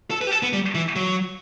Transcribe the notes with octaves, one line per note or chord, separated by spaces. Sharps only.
A4
B4
G4
A4
B3
G3
E3
F#3